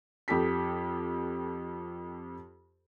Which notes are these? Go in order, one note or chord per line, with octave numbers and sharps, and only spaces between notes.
F2 G4 A4 B6